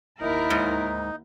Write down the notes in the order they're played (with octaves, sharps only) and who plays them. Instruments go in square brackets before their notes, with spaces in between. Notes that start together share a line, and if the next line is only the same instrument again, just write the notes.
[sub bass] F#1 [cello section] D#2 E4 A#4 [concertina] D#4
[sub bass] D2 [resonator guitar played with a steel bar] G#2